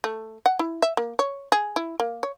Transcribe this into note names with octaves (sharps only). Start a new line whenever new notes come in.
A3
F#5
E4
E5
A#3
C#5
G#4
E4
A#3
C#5